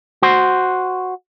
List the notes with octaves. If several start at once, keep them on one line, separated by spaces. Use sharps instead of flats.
F#4 C5